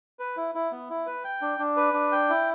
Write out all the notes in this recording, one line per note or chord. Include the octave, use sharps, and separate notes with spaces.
B4
E4
E4
B3
E4
B4
G5
D4
D4
B4
D4
G5
E4